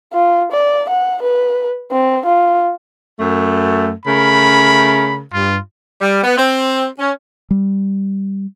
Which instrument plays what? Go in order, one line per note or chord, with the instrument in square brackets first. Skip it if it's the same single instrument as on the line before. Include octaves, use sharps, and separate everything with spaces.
[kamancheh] F4
D5
F#5
B4
C4
F4
[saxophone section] F#2 A3
[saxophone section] C#3 A3 A#4 [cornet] B5
[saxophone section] G2 [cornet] F4
[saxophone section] G3
B3
C4
C#4
[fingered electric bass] G3